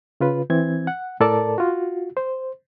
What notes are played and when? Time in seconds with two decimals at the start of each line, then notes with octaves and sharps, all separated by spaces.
0.20 C#3 F4 B4
0.50 E3 C4 G#6
0.87 F#5
1.20 A2 A4 A#4 D5 A5
1.58 F4 F#4
2.17 C5